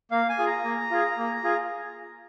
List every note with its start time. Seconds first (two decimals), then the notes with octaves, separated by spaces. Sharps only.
0.11 A#3 F5
0.29 G#5
0.39 F4 G#4
0.47 A#5
0.64 A#3
0.90 F4 G#4
1.18 A#3
1.44 F4 G#4